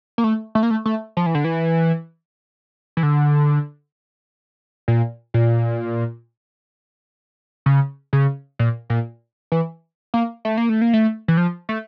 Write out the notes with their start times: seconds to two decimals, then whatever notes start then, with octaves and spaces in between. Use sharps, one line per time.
0.18 A#3
0.24 A3
0.55 A3
0.63 A#3
0.71 A3
0.85 A3
1.17 F3
1.26 E3
1.35 D3
1.44 E3
2.97 E3
3.03 D3
4.88 A#2
5.34 A#2
7.66 C#3
8.13 C#3
8.59 A#2
8.90 A#2
9.52 E3
10.14 A#3
10.45 A3
10.57 A#3
10.69 A3
10.81 A#3
10.93 A3
11.28 E3
11.37 F3
11.69 A3